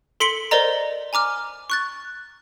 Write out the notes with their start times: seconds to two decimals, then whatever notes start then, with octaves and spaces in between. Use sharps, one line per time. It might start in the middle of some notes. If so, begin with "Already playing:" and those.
0.20 A4 C6 B6 C#7 D7 G7
0.51 A#4 C5 D5 D#5 A#5
1.13 G#5 A#5 D6 F6
1.70 C#6 F#6 A6